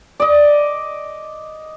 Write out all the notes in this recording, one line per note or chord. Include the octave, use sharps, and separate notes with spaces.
D5 D#5